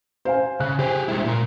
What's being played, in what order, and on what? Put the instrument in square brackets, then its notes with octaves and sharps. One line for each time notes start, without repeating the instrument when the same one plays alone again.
[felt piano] C5 F5 G#5
[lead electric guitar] C#3 [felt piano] F#6
[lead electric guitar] G4 G#4 [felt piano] C5
[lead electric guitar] G#3 E4
A#2 A#4